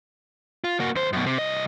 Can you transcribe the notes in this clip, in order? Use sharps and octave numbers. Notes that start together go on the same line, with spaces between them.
F4
A#3 F#4
D#2 C5
F#2 B2
C3
C2 D#5